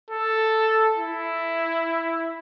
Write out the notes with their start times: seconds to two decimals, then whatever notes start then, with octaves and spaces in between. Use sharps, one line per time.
0.11 A4
0.97 E4